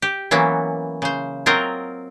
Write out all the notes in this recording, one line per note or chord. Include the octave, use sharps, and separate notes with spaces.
G4
E3 F#3 A#3 B3 C#4
C#3 C5
F#3 C4 F4 A#4 D#5